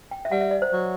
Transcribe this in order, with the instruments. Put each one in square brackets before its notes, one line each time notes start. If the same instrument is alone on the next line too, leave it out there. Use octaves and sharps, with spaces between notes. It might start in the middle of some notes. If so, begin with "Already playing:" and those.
[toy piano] G5
E5
[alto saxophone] G3 [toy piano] F#5
[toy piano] E5
D5
C5
[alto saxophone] F#3